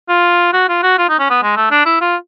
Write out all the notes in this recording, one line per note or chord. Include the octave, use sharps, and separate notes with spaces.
F4
F#4
F4
F#4
F4
D#4
C#4
B3
G#3
A3
D4
E4
F4